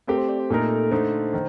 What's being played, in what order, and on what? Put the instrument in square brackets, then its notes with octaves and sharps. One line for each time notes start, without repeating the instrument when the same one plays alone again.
[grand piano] A3 C4 G4 [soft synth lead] A#4
[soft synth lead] C5
D5
C5
[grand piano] A#2 A3 D#4 A#4 [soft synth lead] A4
[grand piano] D3 A3 D#4 [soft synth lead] C5
[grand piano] D#3